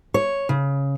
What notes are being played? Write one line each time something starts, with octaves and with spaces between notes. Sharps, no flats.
C#5
C#3